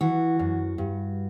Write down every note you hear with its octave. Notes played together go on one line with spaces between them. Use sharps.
E3 F#4
F#2
G2